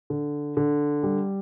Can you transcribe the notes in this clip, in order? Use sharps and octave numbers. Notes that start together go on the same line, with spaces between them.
D3
D3
G3